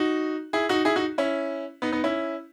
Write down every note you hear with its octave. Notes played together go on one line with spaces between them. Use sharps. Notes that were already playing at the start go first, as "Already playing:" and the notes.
Already playing: D#4 F#4
E4 G#4
D#4 F#4
E4 G#4
D#4 F#4
C#4 E4
B3 D#4
B3 D#4
C#4 E4